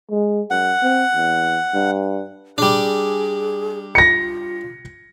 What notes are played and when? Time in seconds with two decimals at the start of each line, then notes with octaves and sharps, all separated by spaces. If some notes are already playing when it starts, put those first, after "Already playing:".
0.11 G#3
0.50 F#2 F#5
0.83 C4
1.15 E2
1.74 G2
2.58 G3 D4 G#4
3.95 F4 A#6 C#7